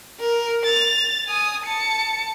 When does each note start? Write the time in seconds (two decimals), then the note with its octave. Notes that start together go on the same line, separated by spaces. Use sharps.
0.20 A#4
0.65 A6 F7
1.26 G#5 D#6
1.64 A5 C#7